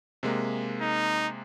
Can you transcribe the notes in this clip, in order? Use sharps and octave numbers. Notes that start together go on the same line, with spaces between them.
C3 G#3 A#3
D#4